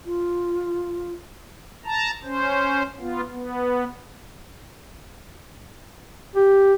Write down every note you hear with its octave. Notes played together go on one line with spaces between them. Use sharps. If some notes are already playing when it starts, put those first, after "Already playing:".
F4
A5 A#5
C#4 C5
B3 F4
B3
G4